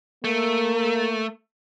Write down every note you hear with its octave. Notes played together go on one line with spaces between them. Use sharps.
A3 A#3